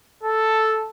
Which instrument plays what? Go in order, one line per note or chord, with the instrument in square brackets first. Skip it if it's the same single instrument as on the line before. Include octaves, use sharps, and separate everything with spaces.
[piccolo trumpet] A4